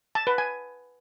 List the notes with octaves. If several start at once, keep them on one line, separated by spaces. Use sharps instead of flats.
A5
B4
G#5